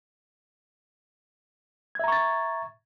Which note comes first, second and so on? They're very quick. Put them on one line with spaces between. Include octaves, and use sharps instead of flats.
G#6 E5 A#5 C#6 A6